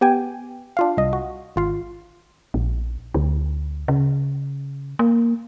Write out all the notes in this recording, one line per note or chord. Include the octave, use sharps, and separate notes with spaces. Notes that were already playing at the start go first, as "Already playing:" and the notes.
B3 G4 G5 G#5
D4 F4 F5
C2 D#5
F#4
G#1 F4 F5
A#1
D2
C#3
A#3